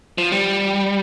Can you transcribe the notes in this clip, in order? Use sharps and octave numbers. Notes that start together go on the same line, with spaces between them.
F3
G3